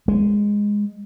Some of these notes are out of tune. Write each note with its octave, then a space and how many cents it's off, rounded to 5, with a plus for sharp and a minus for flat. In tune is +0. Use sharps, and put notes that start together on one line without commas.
G#3 -10